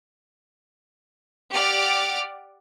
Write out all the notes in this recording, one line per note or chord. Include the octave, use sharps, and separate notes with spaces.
G4 D5 F#5 D6 F6